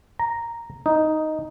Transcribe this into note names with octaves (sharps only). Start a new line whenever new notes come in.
A#5
D#4